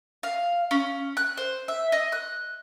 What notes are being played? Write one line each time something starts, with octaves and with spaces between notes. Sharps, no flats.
F5
C#4
F#6
C5
E5
D#5
F#6